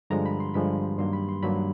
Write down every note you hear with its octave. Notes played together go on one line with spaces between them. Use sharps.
G2 D3 F3 G#3 A#5
B5
C6
G2 D3 F3 G#3 B5
G2 D#3 F#3 A#3 C6
B5
C6
G2 D#3 F#3 A#3 B5